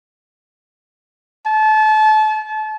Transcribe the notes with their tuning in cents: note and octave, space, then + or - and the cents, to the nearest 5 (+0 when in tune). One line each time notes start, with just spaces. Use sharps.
A5 -30